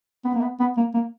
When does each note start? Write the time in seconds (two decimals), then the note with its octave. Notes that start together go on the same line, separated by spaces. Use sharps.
0.25 B3
0.34 A#3
0.41 B3
0.60 B3
0.77 A#3
0.94 A#3